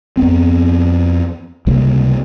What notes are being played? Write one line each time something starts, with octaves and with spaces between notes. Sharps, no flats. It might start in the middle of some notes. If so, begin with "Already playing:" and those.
F2 B3 C4
C#2 C3 G3 A#3